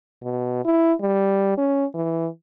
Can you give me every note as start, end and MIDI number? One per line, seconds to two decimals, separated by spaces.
0.22 0.63 47
0.65 0.93 64
1.01 1.56 55
1.57 1.85 61
1.94 2.27 52